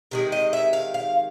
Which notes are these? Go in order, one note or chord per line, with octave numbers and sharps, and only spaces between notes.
C3 D#3 G#3
D#5
E5
F5
F5